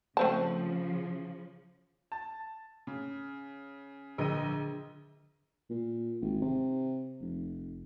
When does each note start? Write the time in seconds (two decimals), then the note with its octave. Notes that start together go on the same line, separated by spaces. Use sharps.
0.17 C#3 F3 A3 C4 G4 C5 F#5 A5
2.12 A5
2.87 C#3
4.18 A#1 D3 D4 G#4 D#5 D#7
5.70 A#2
6.21 G#1
6.41 C3
7.21 F1